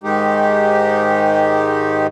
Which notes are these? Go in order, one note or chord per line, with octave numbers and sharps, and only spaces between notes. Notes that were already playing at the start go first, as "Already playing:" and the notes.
G#2 D#3 G#3 D#4 G4